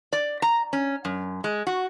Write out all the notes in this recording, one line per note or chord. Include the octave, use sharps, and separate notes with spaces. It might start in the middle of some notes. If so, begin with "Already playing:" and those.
D5
A#5
C#4
F#2
G#3
F#4